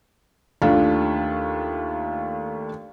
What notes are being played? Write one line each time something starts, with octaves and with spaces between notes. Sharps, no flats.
D#2 A3 D4 F4